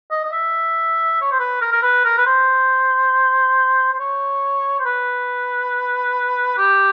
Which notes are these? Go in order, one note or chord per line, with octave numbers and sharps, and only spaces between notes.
D#5
D#5
E5
C#5
C5
B4
A#4
A#4
B4
A#4
B4
C5
C5
C#5
C5
B4
G4